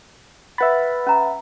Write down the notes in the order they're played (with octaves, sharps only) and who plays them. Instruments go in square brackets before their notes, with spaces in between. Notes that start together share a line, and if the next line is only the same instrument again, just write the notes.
[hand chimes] B4 A6 [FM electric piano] E5 F#5 B5
[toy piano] C#4 A#5